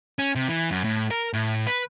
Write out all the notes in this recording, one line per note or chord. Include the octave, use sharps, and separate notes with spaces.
C#4
C3
E3
F#2
A2
A#4
A2
B4